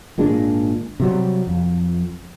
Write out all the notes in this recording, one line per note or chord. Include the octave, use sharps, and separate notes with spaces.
G#1 A#2 G#3 D4
C3 F#3 G3
F2